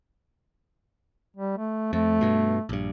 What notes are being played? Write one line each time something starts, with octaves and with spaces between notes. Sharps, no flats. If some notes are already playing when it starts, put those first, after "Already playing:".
G3
A3
F2 A3
G2 B2
A#1 G2